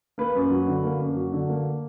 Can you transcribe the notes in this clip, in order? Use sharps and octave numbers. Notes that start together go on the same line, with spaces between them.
A#3 B4
F#2
F#3
D3
A#3
F#2
F#3
D3
A#3